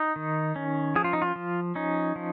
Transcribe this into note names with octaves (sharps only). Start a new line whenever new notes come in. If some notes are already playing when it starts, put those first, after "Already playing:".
Already playing: D#4
D#3
C#4
F3 G#4
F4
D#4
F4
F3
C#4 D#4
F3